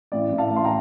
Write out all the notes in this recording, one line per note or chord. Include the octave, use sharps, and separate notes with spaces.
A1 D5
A1
F5 A5
A1 C6
G5 A#5